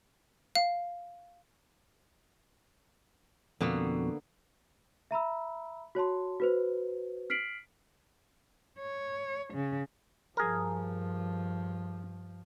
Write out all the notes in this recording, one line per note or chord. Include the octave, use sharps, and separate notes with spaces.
F5
F2 B2 D3 A#3 B3
E5 A#5 B5 E6
F#4 C#5 A5 C6
F#4 B4 C5
F6 B6 C7 D7 F#7
C#5
C#3
G2 F3 G#4 A#4